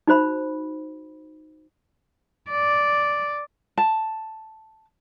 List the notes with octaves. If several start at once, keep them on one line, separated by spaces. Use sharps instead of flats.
D#4 F#4 C5 B5
D5
A5